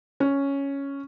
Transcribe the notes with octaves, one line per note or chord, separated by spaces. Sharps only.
C#4